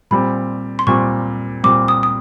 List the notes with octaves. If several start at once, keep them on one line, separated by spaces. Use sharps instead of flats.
A#2 G3 C4 B5
C6
A#2 G3 C4 C#6
A#2 G3 C4 D6
D#6
D#6